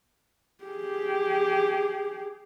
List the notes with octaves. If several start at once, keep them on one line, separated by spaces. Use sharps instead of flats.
G4 G#4